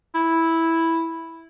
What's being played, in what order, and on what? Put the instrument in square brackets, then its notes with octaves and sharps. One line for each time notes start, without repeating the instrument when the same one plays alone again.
[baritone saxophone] E4